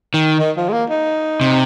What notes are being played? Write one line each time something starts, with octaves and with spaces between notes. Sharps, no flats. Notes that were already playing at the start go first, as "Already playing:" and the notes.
D#3
D#3
F3
G#3
A#3
D#4
C3